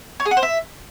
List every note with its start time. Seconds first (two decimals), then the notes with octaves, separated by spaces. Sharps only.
0.20 C#5
0.25 G#4
0.31 F#5
0.37 C5
0.43 E5